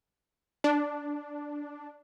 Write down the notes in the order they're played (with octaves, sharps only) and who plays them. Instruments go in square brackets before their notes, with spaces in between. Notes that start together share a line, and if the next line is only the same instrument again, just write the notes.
[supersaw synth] D4